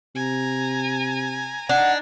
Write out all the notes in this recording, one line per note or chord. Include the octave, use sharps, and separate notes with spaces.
C3 G#5 A#5
D4 D#4 F#5 G#5